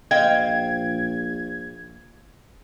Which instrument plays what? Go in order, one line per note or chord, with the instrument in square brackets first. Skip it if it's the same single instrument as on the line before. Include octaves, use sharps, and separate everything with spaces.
[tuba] A#1 [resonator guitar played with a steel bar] C5 F5 G5 [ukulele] D#5 [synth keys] G#6